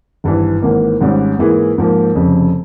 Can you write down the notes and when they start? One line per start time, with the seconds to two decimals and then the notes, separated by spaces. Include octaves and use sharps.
0.24 G#1 G2 E3
0.62 G#1 G#2 E3 A#3
1.01 G#1 G#2 G3 C#4
1.39 G#2 E3 A#3 E4 G#4
1.78 G#2 F3 A#3
2.15 F1 F2 C#3